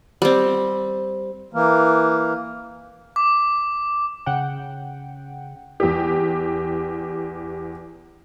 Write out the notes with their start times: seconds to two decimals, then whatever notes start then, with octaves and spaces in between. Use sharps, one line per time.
0.22 G3 C4
1.54 E3 A#3
3.16 D6
4.26 C#3 F#5 G5
5.80 E2 G4